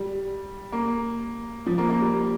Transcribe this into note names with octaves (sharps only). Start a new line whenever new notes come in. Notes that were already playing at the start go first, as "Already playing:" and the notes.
Already playing: G3
A#3
F3
A#3
A#3
G3